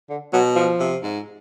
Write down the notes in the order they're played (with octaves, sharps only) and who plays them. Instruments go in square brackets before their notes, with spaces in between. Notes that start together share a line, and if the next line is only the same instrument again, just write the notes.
[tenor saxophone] D3
[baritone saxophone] B2 [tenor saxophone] F#3
[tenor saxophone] F3
[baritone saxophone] C3
G#2